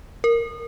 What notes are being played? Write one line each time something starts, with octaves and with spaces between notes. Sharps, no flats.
A#4